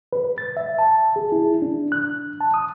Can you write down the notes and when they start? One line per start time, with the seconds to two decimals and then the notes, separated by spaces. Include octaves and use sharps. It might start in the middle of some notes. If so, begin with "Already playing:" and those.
0.13 B4
0.38 A6
0.57 E5
0.79 A5
1.16 G#4
1.32 E4
1.62 D4
1.92 F#6
2.40 A5
2.54 D#6